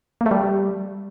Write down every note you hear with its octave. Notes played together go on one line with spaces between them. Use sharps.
A#3
A3
G3